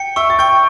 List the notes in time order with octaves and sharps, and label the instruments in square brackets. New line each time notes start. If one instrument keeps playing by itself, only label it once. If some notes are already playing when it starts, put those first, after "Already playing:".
Already playing: [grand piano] G5 [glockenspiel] C#7
[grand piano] E5 E6 [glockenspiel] C#6
[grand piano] A6
[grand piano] G5 G6 [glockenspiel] C#6